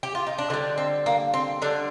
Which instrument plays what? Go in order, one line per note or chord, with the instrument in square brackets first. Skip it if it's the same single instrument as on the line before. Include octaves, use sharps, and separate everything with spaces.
[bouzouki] G4
F4
D#4
D4
D3 C4
G3
C4
A#3
C4
D3 G3 D4